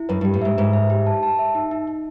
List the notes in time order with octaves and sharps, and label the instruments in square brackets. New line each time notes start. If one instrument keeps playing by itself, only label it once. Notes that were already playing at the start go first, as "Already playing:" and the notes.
Already playing: [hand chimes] E4
[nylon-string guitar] F#2 [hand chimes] B4
[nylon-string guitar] G2 [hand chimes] G4
[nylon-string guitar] A2
[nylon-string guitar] G#2 [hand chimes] E5
[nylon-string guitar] G#2 [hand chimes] B4
[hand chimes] E5
G4
A5
A5
E5
D#4
D#4
D#4